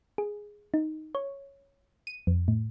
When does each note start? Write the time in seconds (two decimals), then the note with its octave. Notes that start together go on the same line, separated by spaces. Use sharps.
0.18 G#4
0.74 D#4
1.15 C#5
2.07 D#7
2.27 F2
2.48 A2